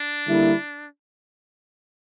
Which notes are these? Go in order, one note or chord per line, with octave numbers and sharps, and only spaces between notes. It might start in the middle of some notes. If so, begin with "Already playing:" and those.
Already playing: D4
D3 G3 A#3 E4